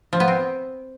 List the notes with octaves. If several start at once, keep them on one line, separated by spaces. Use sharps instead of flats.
F3
B3
C4